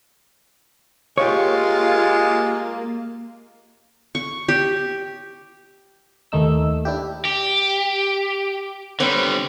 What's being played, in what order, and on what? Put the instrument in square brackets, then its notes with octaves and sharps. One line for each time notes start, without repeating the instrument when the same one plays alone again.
[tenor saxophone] G#3 [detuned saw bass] A#3 [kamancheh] F4 [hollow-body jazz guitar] G4 C#5
[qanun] C#6
G4
[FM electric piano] D#2 D#3 A3 D#4 E6
D4 E4 G4
[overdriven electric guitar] G4
[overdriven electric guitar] D3 G3 [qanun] C4 B4 C#5